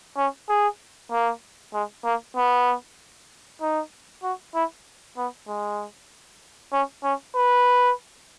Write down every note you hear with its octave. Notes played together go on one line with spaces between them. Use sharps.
C#4
G#4
A#3
G#3
A#3
B3
D#4
F#4
E4
B3
G#3
C#4
C#4
B4